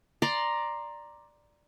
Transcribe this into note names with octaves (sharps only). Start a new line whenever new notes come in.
D5 A#5 C6